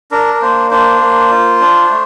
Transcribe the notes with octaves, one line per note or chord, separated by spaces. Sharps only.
D4 A#4
A#4
A#3 C5
D4 C5
A#3
F4
D4
A3